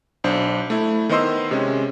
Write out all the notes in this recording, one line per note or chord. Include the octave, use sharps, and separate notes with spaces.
B1 D4 C5
A3 E4
D#3 B3 C5 D#5 C6 E6
C3 G#3 C#4